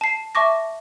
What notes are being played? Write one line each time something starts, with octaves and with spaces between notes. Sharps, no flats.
A5 C7
E5 A5 C#6 D6 A#6